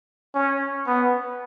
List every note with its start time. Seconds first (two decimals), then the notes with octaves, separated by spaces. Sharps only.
0.34 C#4
0.87 B3